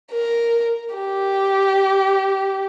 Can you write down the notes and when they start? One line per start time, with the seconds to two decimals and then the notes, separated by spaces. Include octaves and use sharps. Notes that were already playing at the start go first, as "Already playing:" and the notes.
0.12 A#4
0.95 G4